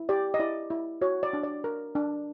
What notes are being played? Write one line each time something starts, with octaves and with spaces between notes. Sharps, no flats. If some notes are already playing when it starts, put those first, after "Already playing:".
Already playing: E4
G4 D5
D#5
E4 D5
E4
F#4 C#5
D5
D4
D5
A#4
D4